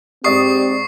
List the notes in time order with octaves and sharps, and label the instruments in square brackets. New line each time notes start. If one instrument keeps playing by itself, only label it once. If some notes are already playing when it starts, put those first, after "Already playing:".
[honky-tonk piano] G#2 D5 D#6 [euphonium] C4 [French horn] G4 [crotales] C#6 C7